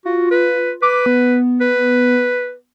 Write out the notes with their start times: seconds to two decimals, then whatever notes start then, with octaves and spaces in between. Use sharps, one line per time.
0.05 F4 F#4
0.31 B4
0.82 B4 D6
1.06 B3
1.61 B4